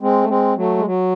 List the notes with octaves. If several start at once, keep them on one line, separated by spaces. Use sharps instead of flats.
G#3 C4
A3
G#3 C4
F#3 A3
G#3
F#3